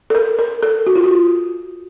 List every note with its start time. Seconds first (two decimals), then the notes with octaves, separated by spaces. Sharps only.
0.10 A4
0.15 A#4
0.39 A#4
0.63 A4
0.87 F#4
0.95 F4
1.04 F#4